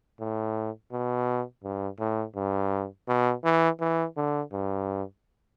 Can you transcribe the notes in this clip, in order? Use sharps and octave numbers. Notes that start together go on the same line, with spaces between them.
A2
B2
G2
A2
G2
B2
E3
E3
D3
G2